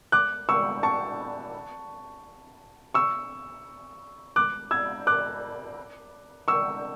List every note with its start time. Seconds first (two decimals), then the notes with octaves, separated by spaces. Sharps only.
0.12 D6 F#6
0.49 C#6 E6
0.83 A5 C#6
2.94 C#6 E6
4.36 D6 F#6
4.71 E6 G#6
5.07 D6 F#6
6.48 C#6 E6